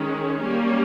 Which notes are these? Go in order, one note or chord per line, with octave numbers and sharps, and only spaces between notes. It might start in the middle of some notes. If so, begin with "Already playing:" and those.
Already playing: D#3 G#3 C#4
G3 A#3 C#4